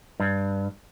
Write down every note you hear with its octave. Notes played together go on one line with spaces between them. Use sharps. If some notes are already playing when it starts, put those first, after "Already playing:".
G2